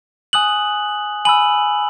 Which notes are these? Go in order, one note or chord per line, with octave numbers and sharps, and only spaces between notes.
G#5 D#6 F#6 F#7
G#5 B5 E6 F#7